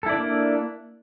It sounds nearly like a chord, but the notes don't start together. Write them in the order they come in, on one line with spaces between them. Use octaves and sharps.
A4 E4 D5 D4 A#3